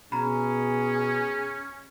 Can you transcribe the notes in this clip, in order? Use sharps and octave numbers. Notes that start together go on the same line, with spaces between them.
B2 C#4 G#4 A#5 B5